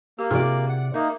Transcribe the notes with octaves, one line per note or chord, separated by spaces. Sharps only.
A#3 G4
C3 E4 F#4 G#4 D5
F#5
A#3 D#4 A#4 E5